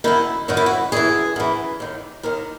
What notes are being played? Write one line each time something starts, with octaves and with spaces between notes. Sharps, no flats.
F#2 D#3 E4
F#2 D#3 F#4
E4
F#4
F#2 E3 G#4
F#2 E3
D#2 D#3
D#2 D#3 A#4